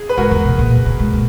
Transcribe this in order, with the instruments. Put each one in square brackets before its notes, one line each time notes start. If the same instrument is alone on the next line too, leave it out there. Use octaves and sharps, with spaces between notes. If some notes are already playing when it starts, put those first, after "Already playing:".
Already playing: [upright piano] G#4
B4
[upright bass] G#2 [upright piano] F#4 A#4
[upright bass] E2
B2
A#2
A#2
G#2
A#2